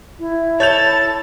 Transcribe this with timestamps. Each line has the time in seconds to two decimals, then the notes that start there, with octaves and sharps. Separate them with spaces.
0.19 E4
0.60 A4 C#5 G6 A6 F7